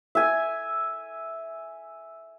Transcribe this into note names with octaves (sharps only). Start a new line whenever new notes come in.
E5 G#5